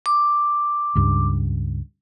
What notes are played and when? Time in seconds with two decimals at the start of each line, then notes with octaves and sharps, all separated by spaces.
0.06 D6
0.95 C#2 G2